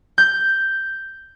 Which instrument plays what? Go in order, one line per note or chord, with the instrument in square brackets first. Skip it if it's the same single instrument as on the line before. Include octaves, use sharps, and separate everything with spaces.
[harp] G6